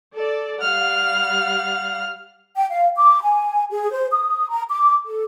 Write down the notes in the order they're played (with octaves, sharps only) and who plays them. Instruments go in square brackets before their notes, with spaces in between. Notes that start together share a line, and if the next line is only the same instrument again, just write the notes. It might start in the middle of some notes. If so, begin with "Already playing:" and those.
[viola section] A4 D5
[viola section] G3 F5 F#5 [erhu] F6
[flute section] G5
F5
D6
G#5
G#4
C5
D#6
A#5
D6
A4